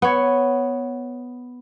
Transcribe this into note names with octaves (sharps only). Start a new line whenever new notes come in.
B3 C#5